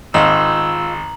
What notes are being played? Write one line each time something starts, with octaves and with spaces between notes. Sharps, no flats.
G#1 D#4 F4 D#5 A#5 E6 F#7